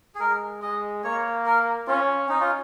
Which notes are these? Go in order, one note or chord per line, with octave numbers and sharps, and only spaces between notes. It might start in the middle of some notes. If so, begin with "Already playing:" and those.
G#4
G#3 A#4
G#3 D#5
A#3 C#5
A#4
C#4 F4
C#4 D#4
F4